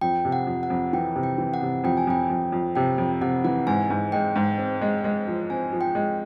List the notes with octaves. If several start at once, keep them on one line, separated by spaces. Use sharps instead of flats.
F2 G5
C3
F#5
F2
F#5
F2
E3 G5
C3
G5
E3
F#5
C3
F2 G5
G#5
F2 G5
F2
F2
C3 G5
F2
C3 F#5
E3 F#5
G#2 G#5
G#2
G#3 G5
G#2
C4
G#3
G#3
F3
C4 G#5
F3
G5
G#3